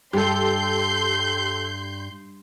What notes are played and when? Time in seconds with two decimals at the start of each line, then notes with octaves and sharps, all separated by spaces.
0.13 G2 G4 A4 C6 G6